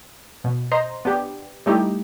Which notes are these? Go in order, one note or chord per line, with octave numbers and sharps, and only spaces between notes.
B2
C5 D#5 A#5 C6
B3 D4 G4
G3 A3 D#4 E4 G4